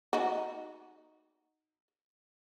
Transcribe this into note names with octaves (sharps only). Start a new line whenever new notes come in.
D#4 F#4